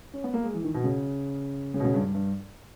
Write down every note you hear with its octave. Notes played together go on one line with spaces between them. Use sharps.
C#4
B3
A#3
G#3
E3
D#3
B2
C#3
C#3
B2
C#3
G2
G2
G2